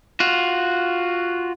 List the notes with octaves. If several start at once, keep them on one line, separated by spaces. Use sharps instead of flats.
F4 F#4